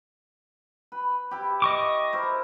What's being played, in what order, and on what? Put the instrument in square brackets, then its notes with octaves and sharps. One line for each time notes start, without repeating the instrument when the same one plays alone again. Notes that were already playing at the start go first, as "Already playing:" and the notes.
[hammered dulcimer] B4
E4 G4
[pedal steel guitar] D#5 C#6 D6
[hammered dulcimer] E4 A#4 C5